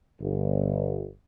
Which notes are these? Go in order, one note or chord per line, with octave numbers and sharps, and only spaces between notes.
G1